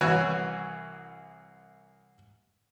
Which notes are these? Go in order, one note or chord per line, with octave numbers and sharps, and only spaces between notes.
C2 E3 F#4 C#5